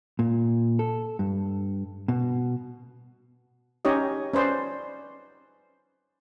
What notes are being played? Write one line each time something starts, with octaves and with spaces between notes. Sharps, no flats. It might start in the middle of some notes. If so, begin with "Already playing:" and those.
A#2
A4
G2
B2
C#4 D#4 G4 C#5 D#5
C#4 B4 C5 D5